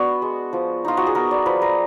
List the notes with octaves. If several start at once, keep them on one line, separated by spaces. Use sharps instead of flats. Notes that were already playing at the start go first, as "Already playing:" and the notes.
Already playing: B3 D4 F#4
G#3
F3
D#4 F4
F#4
G#4
B3 A#4
D5
F3 B4
A#4